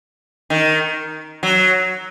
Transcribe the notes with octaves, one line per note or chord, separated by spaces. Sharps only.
D#3
F#3